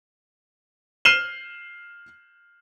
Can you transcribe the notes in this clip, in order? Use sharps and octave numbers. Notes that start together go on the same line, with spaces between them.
F6 C7 D#7 E7 F#7 G7